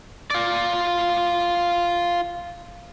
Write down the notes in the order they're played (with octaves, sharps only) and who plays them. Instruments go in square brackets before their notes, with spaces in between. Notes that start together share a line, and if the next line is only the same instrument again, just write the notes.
[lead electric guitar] F4 D5